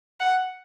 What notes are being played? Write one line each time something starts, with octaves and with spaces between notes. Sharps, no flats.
F#5